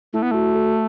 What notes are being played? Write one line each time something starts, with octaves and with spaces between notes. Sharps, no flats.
A3 E4
B3
A3 F#4
A4